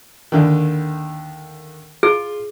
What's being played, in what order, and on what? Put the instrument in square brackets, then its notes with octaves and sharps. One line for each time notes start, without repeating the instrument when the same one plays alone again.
[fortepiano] D#2 D3 D#3
[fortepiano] F4 [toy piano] G#4